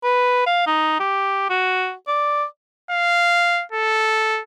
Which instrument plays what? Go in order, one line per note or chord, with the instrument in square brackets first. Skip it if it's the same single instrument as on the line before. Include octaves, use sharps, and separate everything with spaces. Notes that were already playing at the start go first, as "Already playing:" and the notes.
[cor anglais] B4
F5
D#4
G4
F#4
D5
[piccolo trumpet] F5
A4